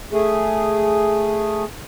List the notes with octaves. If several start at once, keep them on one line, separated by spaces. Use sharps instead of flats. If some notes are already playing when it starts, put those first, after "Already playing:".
A3 G#4